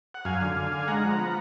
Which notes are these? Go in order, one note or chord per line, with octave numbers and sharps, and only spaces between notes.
F#5
F#2 F5 G#5
D3
D3
D3
G#3 F#5 A#5
F3
B3